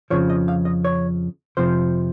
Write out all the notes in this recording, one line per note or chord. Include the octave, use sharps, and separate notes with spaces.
F2 C#3 F3 C#5
D#5
F5
D#5
C#5
F2 C3 F3 C5